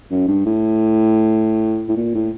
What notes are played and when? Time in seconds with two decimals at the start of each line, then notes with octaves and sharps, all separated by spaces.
0.11 F#2
0.28 G2
0.45 A2
1.88 A2
1.97 A#2
2.15 A2